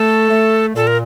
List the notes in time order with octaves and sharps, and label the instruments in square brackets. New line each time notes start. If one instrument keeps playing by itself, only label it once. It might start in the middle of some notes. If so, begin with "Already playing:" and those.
Already playing: [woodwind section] A3 [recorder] A4
[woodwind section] A3
[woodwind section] A#2 [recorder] A4
[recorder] A#4